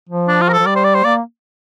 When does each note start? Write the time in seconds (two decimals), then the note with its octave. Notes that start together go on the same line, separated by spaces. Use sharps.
0.09 F3
0.28 D4
0.41 F4
0.49 A#4
0.53 A4
0.59 F3
0.66 G3 D5
0.75 C5
0.84 D5
0.94 C5
1.04 A#3 D5